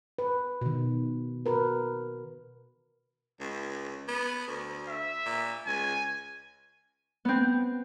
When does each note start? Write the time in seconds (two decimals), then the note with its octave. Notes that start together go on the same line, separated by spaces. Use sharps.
0.18 B4
0.61 B2 D#3
1.46 F#4 A#4 B4
3.40 C#2
4.08 B3
4.47 D2
4.89 E5
5.26 A#2
5.67 C#2 G#5
7.25 B3 C4